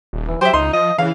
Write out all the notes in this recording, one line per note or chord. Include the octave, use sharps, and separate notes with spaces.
D#1
E3
F#3 G4 C5 E5
C#2 D#4 C6
F3 D#5
C#3 E3 F5